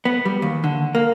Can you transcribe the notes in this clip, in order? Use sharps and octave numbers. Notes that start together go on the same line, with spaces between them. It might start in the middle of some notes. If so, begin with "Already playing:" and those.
B3
G3
D#2
D3
A#3